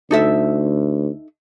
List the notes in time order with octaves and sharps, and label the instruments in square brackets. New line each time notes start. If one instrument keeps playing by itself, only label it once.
[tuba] D2 [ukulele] D#4 A4 E5